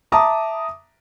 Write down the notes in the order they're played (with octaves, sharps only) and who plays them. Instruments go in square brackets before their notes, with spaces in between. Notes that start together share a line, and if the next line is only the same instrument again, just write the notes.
[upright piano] E5 A5 A#5 D6 D#6